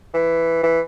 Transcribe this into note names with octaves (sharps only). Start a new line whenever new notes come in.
E3
E3